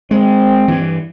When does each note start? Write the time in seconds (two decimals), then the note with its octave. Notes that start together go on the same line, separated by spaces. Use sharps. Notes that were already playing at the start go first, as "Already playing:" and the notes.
0.11 G#3 C4
0.68 G2 E3